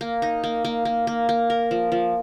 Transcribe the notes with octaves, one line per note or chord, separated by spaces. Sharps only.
A#3
D#4
A#3
A#3
A#3
A#3
A#3
A#4
F3
F3